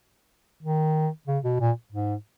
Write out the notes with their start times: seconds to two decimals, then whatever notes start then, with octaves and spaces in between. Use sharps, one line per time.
0.63 D#3
1.27 C#3
1.44 B2
1.60 A#2
1.92 G#2